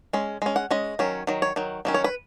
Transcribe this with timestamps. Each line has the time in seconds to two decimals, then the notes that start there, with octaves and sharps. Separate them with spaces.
0.13 G#3 C#4
0.42 G#3 C#4
0.56 F#5
0.71 G#3 C#4 D#5
0.99 D#3 F#3 C#4
1.27 D#3 F#3
1.42 C#5
1.56 D#3 F#3
1.85 D#3 F#3 C#4
1.94 C#5
2.04 B4